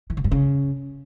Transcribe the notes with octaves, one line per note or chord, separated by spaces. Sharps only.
E3
D3
G2
C#3